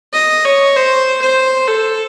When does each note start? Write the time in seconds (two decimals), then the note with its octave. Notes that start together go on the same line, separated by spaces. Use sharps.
0.14 D#5
0.45 C#5
0.76 C5
1.21 C5
1.68 A4